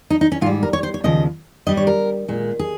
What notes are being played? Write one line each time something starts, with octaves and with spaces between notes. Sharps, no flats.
D#4
D#4
C#4
G#2 G3 F4
A#4
C#5
C5
C#5
D#2 C#3 F3 D#5
G2 G3 D#5
C#5
A#4
A#2 G#3
G#4